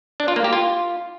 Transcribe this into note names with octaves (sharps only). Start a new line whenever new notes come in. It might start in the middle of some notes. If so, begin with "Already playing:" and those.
D4
F4
A#3
G4
F4